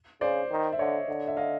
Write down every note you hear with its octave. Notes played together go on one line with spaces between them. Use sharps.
C#3 C5 D5
D#3
E5
D3 C#5 D#5
D3
E5
D#5 F5